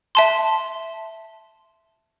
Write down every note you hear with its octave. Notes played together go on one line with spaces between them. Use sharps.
E5 A5 C6